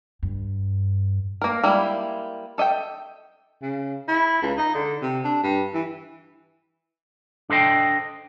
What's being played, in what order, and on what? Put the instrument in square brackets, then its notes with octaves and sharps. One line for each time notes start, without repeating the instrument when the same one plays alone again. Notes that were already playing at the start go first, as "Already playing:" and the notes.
[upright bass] G2
[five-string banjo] A#3 A#4
G3 G#3 A#3 E4
A4 D#5 E5 G5
[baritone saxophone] C#3
E4
C#2
D#4
D3
C3
D4
G2
E3
[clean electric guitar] D4 A4 C5 D#5 G5